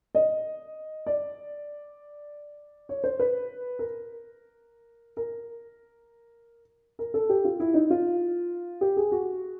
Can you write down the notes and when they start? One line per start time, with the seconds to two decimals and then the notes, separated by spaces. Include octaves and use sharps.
0.15 D#5
1.07 D5
2.89 C#5
3.04 C5
3.19 B4
3.79 A#4
5.17 A#4
6.99 A#4
7.14 A4
7.29 G4
7.45 F4
7.60 E4
7.74 D#4
7.90 F4
8.81 G4
8.97 G#4
9.12 F#4